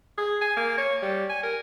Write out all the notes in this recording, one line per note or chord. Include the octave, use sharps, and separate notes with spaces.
G#4
G#5
A#3
C#5
G3
G#5
A#4